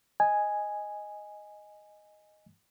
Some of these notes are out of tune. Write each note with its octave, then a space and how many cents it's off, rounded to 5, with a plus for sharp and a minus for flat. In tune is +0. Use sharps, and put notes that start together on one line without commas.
D#5 +0 G#5 +0